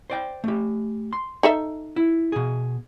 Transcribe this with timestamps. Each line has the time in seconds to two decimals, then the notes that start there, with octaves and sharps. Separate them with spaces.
0.10 C5 D5 G5
0.44 A3 G4
1.13 C6
1.43 D#4 A4 E5
1.96 E4
2.32 B2 G#4